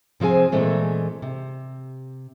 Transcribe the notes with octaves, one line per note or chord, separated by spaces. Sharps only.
C3 F3 C4 G#4 G#5
A#2 E3 G#3 A3 C4
C3